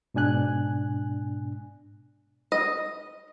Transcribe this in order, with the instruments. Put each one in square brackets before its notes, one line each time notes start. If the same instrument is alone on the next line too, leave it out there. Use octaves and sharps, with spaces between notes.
[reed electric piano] G#2 B2 D4 G#5 F#6
[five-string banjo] D#5